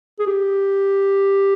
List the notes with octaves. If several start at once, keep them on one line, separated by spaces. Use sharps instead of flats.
G#4
G4